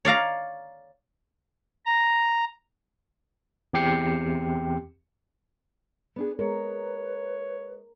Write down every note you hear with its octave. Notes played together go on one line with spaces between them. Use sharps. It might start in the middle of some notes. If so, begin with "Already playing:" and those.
C#5 D5 F5 A#5
A#5
E2 C4 G4 G5 C7 C#7
B3 D4 G#4
G#3 A#4 B4 C#5